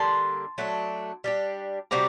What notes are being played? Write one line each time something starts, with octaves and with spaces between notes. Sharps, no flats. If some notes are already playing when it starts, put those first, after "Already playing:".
Already playing: D3 G3 A#3 A5 C6
F#3 A3 D4
G3 D4 G4
C3 G3 C4 F#4 A#5 D6